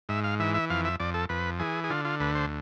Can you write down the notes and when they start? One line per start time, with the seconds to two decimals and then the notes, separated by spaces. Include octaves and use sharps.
0.09 G#2 E5
0.24 F5
0.40 E3 E5
0.55 E5
0.70 F2 F5
0.85 E5
1.00 F2 D5
1.14 A4
1.29 F2 B4
1.59 E3 G#4
1.84 G#4
1.90 D3 F4
2.05 F4
2.20 D2 B4
2.35 C5